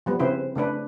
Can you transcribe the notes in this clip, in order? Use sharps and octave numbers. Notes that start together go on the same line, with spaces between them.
F3 G3 B3
C#3 C4 E4 B4 C5
C#3 A3 D4 B4